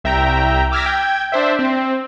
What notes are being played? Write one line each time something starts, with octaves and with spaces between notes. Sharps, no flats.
C2 E5 G5 A#5
D6 E6 F6 G#6 A#6 B6
G5 G#6
D4 C5 E5
C4